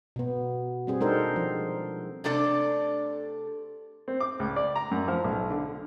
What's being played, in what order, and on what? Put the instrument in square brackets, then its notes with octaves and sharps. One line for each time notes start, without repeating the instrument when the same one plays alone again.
[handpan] B2 B3
G3 C4 G#4
G#3 D4 D#4 A4 A#4 C5
F3
[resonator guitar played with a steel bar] C3 A3 D4 A4 D5
[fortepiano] C4
D6
C#2
D5
A#5
F#2
F3
B1
D3